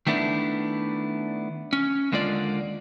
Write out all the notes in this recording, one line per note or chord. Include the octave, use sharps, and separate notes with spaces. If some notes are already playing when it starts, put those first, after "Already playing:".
D#3 A3 B3 D4 E4
C#4
D#2 D3 G#3 A#3 F4 D5